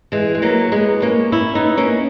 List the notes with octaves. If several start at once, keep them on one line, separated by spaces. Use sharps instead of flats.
E3 G#3
G#3
F#3 A#3
G#3 B3
A#3 C#4
C#4 E4
B3 D#4
A#3 C#4